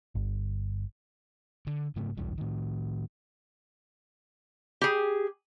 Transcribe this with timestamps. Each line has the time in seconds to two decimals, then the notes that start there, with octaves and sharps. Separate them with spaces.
0.15 G1
1.67 D3
1.96 G#2 C#3 A3
2.17 F#1 B1 E2 G3
2.38 A2 D#3
4.82 G4 G#4